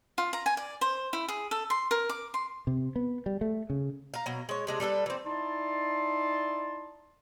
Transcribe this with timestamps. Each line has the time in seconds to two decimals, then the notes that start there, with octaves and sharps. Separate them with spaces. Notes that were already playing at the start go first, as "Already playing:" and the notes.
0.18 F4
0.33 A#5
0.46 G#5
0.57 D5
0.81 C5
1.13 E4
1.28 G#4
1.51 A4
1.70 C6
1.91 A#4
2.09 D6
2.34 C6
2.67 C3
2.96 B3
3.26 G3
3.41 A3
3.70 C#3
4.14 F5 A#5
4.26 B2 F#3
4.49 G#3 C#5
4.67 C3 G#3 D4
4.80 G3 D4 A4 B4
5.06 E3 C4
5.25 D#4 E4 D5 A5 C6